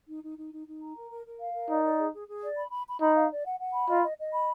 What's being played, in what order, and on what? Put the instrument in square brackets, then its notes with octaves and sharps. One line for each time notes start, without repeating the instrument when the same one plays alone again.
[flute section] D#4
D#4
D#4
D#4
D#4
A#5
A#4
A#4
A#4
F5
A#4
[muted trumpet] D#4 [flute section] D5
[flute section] D5
G#4
G#4
G#4
D5
B5
B5
B5
[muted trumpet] D#4 [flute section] B5
[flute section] F5
D5
F#5
F#5
B5
[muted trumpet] F4 [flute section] D#5
[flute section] D#5
D#5
B5